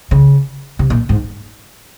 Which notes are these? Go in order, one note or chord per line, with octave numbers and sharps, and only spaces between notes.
C#3
C3
A#2
G#2